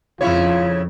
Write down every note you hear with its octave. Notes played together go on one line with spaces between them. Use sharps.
F2 C#3 E4 F4 C#5